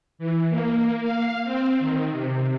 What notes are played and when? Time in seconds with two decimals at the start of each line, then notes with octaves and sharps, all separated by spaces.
0.19 E3
0.49 A#3
1.02 F5
1.44 C4
1.80 D#3
2.11 C3